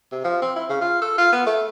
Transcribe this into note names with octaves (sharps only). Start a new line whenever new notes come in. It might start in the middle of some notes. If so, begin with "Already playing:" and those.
C3
F3
C4
E4
C#3
F4
A4
F4
B3
A3